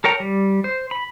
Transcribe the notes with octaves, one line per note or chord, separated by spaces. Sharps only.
A4 A#4 C#5 G5 A#5
G3
C5
B5